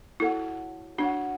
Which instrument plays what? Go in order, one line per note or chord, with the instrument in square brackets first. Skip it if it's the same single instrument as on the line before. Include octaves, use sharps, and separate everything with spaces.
[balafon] E4 [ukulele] F#4 A4 C#5 F#5
[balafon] D4 [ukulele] F#4 C#5 F#5